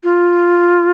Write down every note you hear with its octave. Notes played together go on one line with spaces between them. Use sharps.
F4